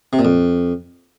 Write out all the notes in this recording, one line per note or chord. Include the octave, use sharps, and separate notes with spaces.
C3
A#2
F2